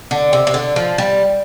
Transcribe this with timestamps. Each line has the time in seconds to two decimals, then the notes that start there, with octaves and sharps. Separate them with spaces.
0.11 D3
0.33 C3
0.47 C3
0.54 D3
0.76 F3
0.98 G3